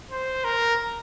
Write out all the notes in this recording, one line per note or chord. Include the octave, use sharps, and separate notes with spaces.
C5
A#4